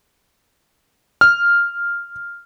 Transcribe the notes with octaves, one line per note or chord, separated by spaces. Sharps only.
F6